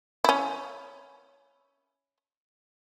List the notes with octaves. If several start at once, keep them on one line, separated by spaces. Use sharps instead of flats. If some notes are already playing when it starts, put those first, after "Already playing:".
C#4 E4